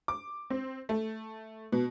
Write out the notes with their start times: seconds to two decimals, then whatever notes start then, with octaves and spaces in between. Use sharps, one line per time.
0.08 D6
0.50 C4
0.89 A3
1.72 B2